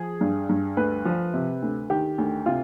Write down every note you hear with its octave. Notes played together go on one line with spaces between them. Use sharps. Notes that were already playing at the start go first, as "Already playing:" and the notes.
Already playing: F3 G#4
G2
G2
D2 B4
F3
C3
D2
D#3 G4
D2
C3 F4